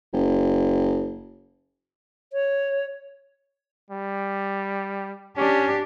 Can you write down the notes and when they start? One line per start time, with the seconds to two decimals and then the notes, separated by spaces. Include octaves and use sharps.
0.13 F#1
2.33 C#5
3.90 G3
5.37 C#4 D4 G4